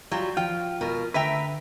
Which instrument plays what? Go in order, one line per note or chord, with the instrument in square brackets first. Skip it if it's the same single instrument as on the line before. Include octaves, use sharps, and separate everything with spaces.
[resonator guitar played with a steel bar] F#3 G3 F4 [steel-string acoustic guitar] F#4
[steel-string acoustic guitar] F3 [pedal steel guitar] F4 [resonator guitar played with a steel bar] G5
[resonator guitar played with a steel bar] B2 [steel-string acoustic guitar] A#4
[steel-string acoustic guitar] D3 [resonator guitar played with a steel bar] A3 E5 G5 [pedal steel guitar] B4 A#5